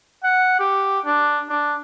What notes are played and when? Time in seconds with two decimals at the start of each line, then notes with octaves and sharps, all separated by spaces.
0.24 F#5
0.60 G4
1.06 D4
1.50 D4